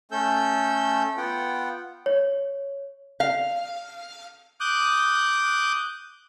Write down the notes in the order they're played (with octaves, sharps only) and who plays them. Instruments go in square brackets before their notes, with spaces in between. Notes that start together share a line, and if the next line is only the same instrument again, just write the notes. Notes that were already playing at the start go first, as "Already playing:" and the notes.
[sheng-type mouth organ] A3 C#4 A4 E6 G6
B3 F4 F#5 G5
[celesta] C#5
[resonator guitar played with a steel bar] F5
[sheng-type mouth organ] D6 D#6 F#6 G6